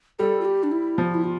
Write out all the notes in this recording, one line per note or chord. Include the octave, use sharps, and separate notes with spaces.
G3 A4
F4
G4
D4
E4
F3 F4
E4
F4